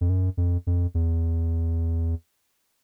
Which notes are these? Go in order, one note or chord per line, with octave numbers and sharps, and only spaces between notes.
F2
F#2
F2
F2
E2